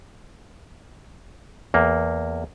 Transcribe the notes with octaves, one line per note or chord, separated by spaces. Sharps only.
E2 A#3